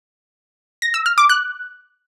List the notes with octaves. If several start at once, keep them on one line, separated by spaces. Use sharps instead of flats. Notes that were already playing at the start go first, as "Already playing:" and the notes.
A#6
E6
F6
D6
F#6